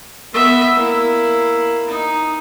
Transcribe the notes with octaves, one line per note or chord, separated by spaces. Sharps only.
B3 E5
A#3 E4
D#4